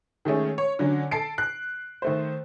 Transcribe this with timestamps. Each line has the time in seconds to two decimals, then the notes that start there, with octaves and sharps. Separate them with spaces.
0.25 D#3 G#3 A3 C#4
0.58 C#5
0.79 D3 F#3 C#4
1.11 A4 A5 C7 D7
1.38 F#6
2.02 D#3 A3 C5